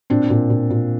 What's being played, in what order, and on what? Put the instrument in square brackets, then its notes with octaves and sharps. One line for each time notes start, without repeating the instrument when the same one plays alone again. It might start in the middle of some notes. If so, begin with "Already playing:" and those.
[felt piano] A#2 C4 D4
A#2
A#2
A#2